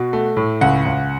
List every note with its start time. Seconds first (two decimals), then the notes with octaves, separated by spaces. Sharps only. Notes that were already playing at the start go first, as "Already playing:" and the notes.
Already playing: B2 F#4
0.13 A3
0.37 A2
0.61 C#2 F#5
0.85 C#2